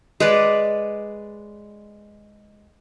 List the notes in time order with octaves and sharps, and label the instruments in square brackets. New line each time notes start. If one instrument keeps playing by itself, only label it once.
[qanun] G#3 B4 D5